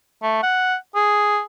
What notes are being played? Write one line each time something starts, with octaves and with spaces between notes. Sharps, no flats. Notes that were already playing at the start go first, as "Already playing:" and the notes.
A3
F#5
G#4